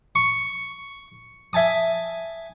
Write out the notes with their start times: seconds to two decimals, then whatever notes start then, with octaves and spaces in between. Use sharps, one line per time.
0.15 C#6
1.53 E5 G#5 A5 D#6